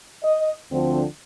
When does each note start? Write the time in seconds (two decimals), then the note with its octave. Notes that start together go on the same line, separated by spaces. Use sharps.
0.24 D#5
0.71 D2 D3 F3 C4